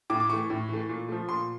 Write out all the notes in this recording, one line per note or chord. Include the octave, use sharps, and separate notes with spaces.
A2 D6
D6
E3 A3 C#6
A2
E3 A3
A#2
F3 A3
A#2 C6